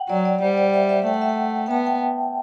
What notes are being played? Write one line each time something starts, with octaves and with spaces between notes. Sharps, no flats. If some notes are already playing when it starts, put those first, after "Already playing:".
Already playing: F#5 G5
F#3 D5
D5
G3 C5
D5
E5
E5
A3 G5
F#5
E5
F#5
G5
B3 A5
G5